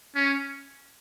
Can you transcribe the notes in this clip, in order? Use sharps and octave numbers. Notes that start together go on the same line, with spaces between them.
C#4